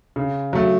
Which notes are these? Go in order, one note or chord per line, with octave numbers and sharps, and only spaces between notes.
C#3
F#3 A3